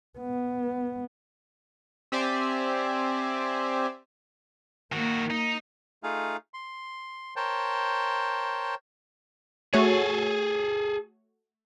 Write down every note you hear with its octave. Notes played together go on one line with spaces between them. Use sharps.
B3
C4 G4 C5 D5 E5 G#5
D#3 A#3 F#4
D#4
A3 D#4 F4 G#4 F5
C6
A#4 C5 C#5 G5 A5
A3 F#4 G#4 A4 C#5